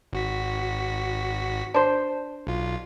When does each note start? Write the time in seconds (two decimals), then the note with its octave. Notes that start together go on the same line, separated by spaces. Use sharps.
0.13 G#1 F#4 B6
1.74 D4 C5
2.47 B1 F4